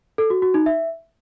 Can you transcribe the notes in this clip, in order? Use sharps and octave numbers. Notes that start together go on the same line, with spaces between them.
A4
F#4
F#4
D#4
E5